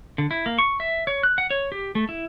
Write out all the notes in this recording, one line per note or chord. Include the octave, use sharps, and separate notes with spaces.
D3
E4
A#3
C#6
E5
C#5
F#6
F#5
C#5
G4
A3
E4